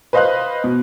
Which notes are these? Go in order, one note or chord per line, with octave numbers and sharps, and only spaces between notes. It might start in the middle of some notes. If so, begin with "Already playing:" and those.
B4 C5 D#5 F5 C6 F#6
B2